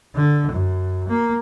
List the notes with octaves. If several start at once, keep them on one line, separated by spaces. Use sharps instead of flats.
D3
F#2
A#3